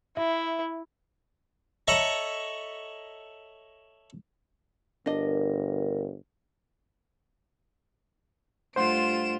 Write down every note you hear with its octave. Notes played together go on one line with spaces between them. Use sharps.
E4 E5
A4 C#5 D#5 E5 A#5 B5
G1 D4 A#4 D#5
G2 A3 F4 C5 F#5 C6 D7 E7